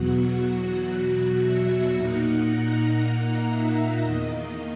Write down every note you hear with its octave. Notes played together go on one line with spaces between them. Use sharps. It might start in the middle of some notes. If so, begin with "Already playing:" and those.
Already playing: E2 B2 F#3 F#4
F#4
E5
A#2 A#3 D#4 F#5
A#5
F#5
E5
E2 D#3 A#3 D#5